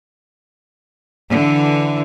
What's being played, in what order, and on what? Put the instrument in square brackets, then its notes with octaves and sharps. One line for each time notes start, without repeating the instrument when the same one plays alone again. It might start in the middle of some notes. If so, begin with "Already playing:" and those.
[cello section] D3 E3